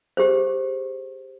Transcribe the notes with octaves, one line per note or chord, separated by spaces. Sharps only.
G4 G#4 C5